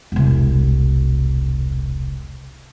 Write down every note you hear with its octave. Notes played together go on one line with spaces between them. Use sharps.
E1 C2